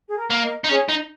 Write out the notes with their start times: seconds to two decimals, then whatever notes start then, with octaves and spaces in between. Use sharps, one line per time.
0.09 G#4
0.18 A#4
0.30 A#3
0.43 A#4 D#5
0.63 D#4 D#5
0.68 C#4 G#4 C#5
0.89 D#4